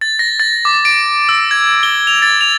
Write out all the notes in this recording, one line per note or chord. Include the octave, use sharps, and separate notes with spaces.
A6
A#6
A6
D6
D7
E6
G#6
G7
F7
A6
F7